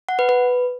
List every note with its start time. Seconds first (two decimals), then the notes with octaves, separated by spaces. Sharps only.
0.09 F#5
0.19 B4
0.29 B4